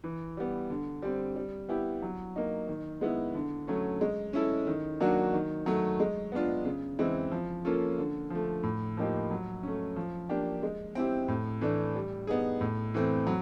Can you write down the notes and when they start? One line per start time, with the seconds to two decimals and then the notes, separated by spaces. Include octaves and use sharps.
0.04 E3
0.37 G3 B3
0.70 D3
1.02 G3 C4
1.36 G3
1.69 B3 E4 G4
2.02 F#3
2.36 A#3 D#4
2.68 D#3
3.01 G#3 B3 E4
3.34 D3
3.67 F#3 A3 C#4
4.01 G#3
4.33 C#4 E4 A4
4.67 D#3
5.00 F#3 A#3 D4 F#4
5.33 D#3
5.66 F#3 A3
6.00 G#3
6.32 B3 D4 F4
6.65 C#3
6.99 E3 G#3 C4 E4
7.31 F3
7.65 A#3 C#4 F4 A4
7.98 D3
8.30 F3 A3
8.63 A2
8.97 F3 A#3 D#4 G4
9.31 F#3
9.63 A3 C#4
9.96 F3
10.29 A#3 D4 G4
10.63 G#3
10.95 C4 E4 G4
11.28 A2
11.61 E3 A3 D4
11.96 G3
12.27 B3 D#4 G#4
12.61 A2
12.94 E3 A3 C4
13.27 F#3